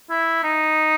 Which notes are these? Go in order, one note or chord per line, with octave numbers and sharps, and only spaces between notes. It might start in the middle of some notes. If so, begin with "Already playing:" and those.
E4
D#4